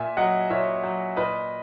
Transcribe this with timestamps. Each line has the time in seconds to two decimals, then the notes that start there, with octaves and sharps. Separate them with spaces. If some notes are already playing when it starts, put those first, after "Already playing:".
Already playing: A#2 E5 G#5
0.17 F#3 D#5 F#5
0.50 A#2 C#5 E5
0.83 F#3
1.16 A#2 B4 D#5